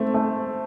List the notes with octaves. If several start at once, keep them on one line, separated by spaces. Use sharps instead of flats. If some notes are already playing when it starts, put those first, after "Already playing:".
Already playing: A3 C4
A3